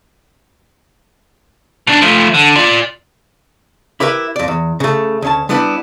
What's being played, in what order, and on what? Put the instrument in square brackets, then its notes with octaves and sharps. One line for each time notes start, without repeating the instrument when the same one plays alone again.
[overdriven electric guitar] B2 D4
F3 A3
D3
F4 D5
[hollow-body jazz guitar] E4 G4 A#4 B4 E5
F2 D5
E2
C#3 A3
D2 C#4 A5
G3 B3 D4 E4 G4 B4